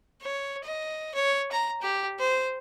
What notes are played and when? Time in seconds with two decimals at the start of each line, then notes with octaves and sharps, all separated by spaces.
0.22 C#5
0.64 D#5
1.15 C#5
1.52 A#5
1.82 G4
2.19 C5